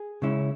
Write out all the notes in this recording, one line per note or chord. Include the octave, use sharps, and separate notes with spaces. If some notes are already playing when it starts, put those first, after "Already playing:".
Already playing: G#4
C#3 G#3 C#4 E4